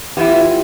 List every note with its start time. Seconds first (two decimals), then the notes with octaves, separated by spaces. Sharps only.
0.17 E3 B3 E4 G4
0.29 F4
0.41 E4